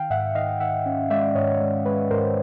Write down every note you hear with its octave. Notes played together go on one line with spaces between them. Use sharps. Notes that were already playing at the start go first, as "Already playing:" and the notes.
Already playing: D#3 F5 G5
G#2 E5 F#5
D#3 D#5 F5
D#3 E5 F#5
C#4
G#3 D5 E5
G#2 C#5 D#5
G#3
G#3 B4 C#5
G#2 A#4 C5